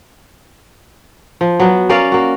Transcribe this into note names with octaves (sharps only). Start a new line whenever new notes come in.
F3
F#3 B3
C#4 A#4 D5 F5
A#3 F#4